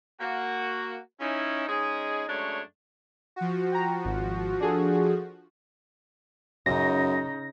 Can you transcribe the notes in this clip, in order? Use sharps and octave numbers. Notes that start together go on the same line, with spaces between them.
A#3 F#4
C#4 D#4 E4
G#3 C#4 D#4 G#4
F#2 G#3 A3 D4 C#5
F3 F#4
G5 A#5
G#1
D4 G#4 A4
F#2 C#3 D#4 A#6